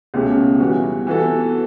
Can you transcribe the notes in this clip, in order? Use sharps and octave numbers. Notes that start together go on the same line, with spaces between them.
C#2 B2 A3 C#4 G4
E3 G3 B3 F#4
E3 B3 F#4 A4